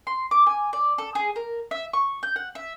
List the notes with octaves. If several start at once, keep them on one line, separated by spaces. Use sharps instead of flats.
C6
D6
G#5
D5
A4
G#4
A#4
E5
C#6
G6
F#5
E5